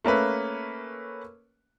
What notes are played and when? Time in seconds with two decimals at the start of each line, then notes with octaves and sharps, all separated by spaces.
0.04 A3 A#3 C#4 B4